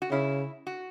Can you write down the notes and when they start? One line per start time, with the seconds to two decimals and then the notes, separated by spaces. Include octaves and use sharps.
0.02 F#4
0.11 C#3 E4
0.67 F#4